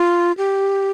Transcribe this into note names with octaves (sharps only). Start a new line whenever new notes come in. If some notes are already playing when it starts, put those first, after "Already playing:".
Already playing: F4
G4